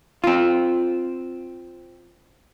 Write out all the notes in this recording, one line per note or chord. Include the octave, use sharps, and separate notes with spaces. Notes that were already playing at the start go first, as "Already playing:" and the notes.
C4 F4